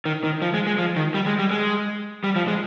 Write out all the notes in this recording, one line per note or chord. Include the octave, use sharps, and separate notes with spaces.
D#3
D#3
F3
G#3
G#3
F3
D#3
G3
G#3
G3
G#3
G3
F3
G#3